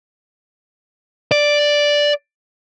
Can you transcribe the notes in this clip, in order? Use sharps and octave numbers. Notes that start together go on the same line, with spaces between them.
D5